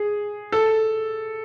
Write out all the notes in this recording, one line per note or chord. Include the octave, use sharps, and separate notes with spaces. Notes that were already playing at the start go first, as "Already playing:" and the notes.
Already playing: G#4
A4